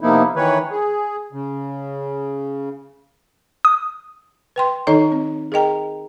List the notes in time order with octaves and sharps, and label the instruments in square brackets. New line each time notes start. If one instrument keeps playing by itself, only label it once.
[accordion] C3 F3 A#3 B3 D#4 E4
D#3 E3 B4 C#5
G#4
C#3
[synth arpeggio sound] D#6
[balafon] B4 G5 C6
D#3 D#4 A4 C#5 D#5 A#5
C4
G#4 A#4 D#5 G5 A#5